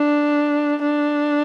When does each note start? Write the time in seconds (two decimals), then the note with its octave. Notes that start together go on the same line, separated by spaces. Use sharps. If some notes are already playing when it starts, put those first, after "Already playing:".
Already playing: D4
0.82 D4